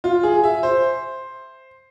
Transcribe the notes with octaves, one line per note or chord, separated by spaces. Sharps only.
F4
G#4
E5
C5